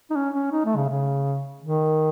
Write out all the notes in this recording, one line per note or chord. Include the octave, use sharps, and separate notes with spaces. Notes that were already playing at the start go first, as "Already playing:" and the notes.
D#4
C#4
C#4
D#4
A3
C#3
C#3
D#3